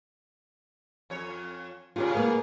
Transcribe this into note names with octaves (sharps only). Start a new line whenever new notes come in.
F2 C#5
A2 C#3 F4 G4 C#5
A#3 B3